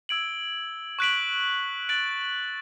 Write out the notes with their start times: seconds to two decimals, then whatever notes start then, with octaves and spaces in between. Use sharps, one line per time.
0.09 E6 G#6 D7 F#7
0.99 C#6 F#6 B6 D7 F#7
1.89 F#6 A6 D7 F#7